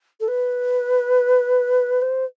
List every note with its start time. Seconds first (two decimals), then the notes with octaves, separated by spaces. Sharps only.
0.20 A4
0.28 B4
2.01 C5